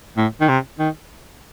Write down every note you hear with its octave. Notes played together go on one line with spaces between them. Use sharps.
A2
D#3
C3
D#3